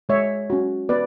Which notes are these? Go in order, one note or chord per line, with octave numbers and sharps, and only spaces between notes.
G#3 C#5 E5
C#4 F#4
B3 B4 D5